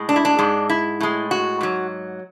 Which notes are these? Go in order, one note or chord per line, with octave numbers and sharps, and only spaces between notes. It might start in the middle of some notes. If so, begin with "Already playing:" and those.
Already playing: A2 G#3
D4
E4
D4
G#2 G#3
E4
A2 G#3
F#4
G#2 F#3